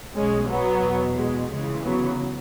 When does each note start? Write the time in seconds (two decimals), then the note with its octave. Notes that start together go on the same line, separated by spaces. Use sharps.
0.15 B1 B2 G#3 C#4
0.49 F#3 B3
0.83 E2 B2
1.17 G#3
1.51 C#2 C#3 E3 G#3
1.84 F#3 B3